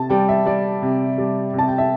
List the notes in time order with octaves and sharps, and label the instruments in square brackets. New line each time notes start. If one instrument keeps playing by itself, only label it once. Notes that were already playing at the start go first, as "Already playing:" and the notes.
Already playing: [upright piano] C3 A5
G3 G5
E5
G3 D5
C3
G3
C3 A5
G5
E5